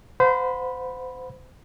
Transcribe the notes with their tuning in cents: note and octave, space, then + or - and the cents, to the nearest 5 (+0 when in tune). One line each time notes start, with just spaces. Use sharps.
C5 -30 F#5 -35 B5 -10